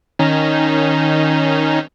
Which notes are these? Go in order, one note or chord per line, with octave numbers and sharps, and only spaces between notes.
D#3 C#4 D#4